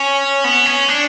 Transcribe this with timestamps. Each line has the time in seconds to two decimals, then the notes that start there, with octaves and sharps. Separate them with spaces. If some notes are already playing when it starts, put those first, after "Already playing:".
Already playing: C#4
0.44 B3
0.66 C#4
0.88 D4